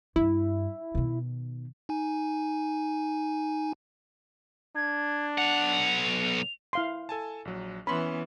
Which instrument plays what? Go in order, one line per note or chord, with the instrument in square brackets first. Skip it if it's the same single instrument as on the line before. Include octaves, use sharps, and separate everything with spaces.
[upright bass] G2 [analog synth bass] E4
[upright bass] B2 D#3
[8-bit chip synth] D#4 G#5
[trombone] D4 [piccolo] G#6
[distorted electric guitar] B1 F#5 [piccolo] F7
[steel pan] E4 F5 C6
[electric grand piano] A4 G#5 A5
A#1 F#3
[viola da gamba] E3 B3 [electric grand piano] C#4 C6 [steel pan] B5